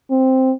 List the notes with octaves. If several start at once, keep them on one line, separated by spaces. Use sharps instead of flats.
C4